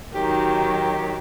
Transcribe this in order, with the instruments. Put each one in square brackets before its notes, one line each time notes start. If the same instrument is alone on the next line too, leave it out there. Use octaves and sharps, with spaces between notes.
[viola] D#3 F#3 [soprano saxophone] G4